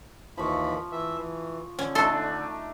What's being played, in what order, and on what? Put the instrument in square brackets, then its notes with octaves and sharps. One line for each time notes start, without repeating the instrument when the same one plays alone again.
[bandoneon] D#2 E3 B5 [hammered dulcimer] F3 C#6
[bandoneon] E3 E5
E3
[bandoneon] D3 [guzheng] C#4
[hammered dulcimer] A3 D4 D#4 [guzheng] A4 C6